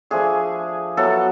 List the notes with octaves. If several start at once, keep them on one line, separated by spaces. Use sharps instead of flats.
F3 A3 D4 G#4
F#3 B3 E4 A4